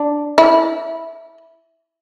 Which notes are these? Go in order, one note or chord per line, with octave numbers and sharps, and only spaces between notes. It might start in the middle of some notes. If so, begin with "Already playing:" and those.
Already playing: D4
E4